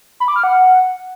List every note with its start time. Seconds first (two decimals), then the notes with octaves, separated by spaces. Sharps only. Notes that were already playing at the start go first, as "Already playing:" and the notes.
0.20 B5
0.28 D6
0.36 F6
0.44 F#5